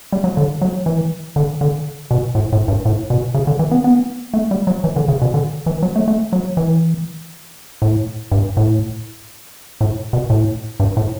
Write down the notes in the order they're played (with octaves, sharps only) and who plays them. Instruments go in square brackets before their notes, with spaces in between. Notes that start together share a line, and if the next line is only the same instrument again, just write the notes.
[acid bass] G3
F#3
D3
F#3
E3
D3
D3
B2
A2
A2
G2
A2
B2
C#3
D3
E3
B3
B3
A3
G3
F#3
E3
D3
C#3
B2
D3
E3
F#3
A3
A3
F#3
E3
A2
G2
A2
A2
B2
A2
G2
A2